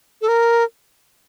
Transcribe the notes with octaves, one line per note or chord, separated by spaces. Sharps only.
A4
A#4